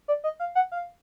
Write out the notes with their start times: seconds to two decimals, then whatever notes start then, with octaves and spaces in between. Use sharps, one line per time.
0.08 D5
0.24 D#5
0.40 F5
0.55 F#5
0.72 F5